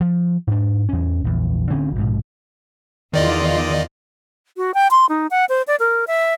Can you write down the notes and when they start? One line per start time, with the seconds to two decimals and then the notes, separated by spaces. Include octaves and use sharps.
0.01 F3
0.47 G#2 D4
0.89 E2 C#4
1.24 A#1 E2
1.70 D1 D3 C4 C#4
1.96 A#1 G#2 B2
3.14 E2 D#3 F4 D5 D#5
4.57 F#4
4.74 G5
4.91 C6
5.09 D#4
5.31 F#5
5.49 C5
5.67 D5
5.80 A#4
6.07 E5